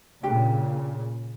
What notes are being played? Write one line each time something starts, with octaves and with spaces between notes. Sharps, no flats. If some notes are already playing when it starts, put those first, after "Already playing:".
A#2 C#3 D4 G4 G5